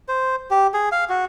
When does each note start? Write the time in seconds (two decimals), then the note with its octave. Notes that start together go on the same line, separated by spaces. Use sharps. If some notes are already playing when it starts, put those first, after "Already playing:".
0.08 C5
0.50 G4
0.74 G#4
0.92 F5
1.09 F#4